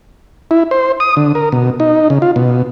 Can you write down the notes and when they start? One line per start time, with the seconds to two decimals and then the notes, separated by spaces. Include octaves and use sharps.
0.51 E4
0.71 C5
1.00 D#6
1.17 D3
1.35 A#4
1.52 B2
1.80 D#4
2.10 C#3
2.22 F4
2.36 B2